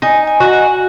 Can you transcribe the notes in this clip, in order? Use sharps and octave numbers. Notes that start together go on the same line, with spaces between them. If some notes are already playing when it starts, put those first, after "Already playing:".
D#4 G#5
G#5
F#4
G#5